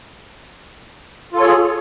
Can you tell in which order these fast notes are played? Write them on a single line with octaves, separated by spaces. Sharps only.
F4 A4 C#5 G#4